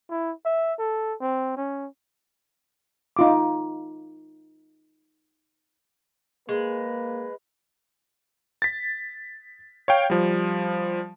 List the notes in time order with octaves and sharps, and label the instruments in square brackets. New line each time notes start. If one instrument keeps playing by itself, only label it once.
[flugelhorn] E4
E5
A4
C4
C#4
[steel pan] D#4 F4 D6
[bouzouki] G#3 [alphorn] A#3 [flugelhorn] B4
[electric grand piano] A6 B6
C#5 F5 G5
F3 G3